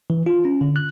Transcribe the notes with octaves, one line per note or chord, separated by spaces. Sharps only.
E3
F4
C#4
D3
F#6